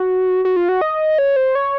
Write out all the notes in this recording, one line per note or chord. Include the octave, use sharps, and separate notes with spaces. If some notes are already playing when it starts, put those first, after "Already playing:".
Already playing: F#4
F#4
F4
F#4
D#5
C#5
C5
C#5